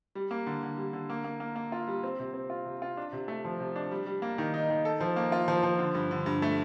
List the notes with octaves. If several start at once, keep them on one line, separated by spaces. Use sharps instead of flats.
G3
A#3
D3
D3
G3
D3
A#3
A#3
A#3
A#3
F4
G3
C4
C3
C4
F4
C3
F4
D4
C3
A3
F3
C3
D4
G3
G3
A#3
D#3
D#4
D#3
A4
F3
A#3
F4
F3
F3
D3
G2
D3
G2
A3